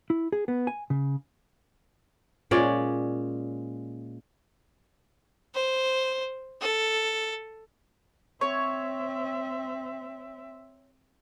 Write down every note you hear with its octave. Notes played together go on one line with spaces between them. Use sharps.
E4
G#4
B3
G#5
C#3
A#2 G#3 C#4 D5
C5
A4
C4 C#5 E5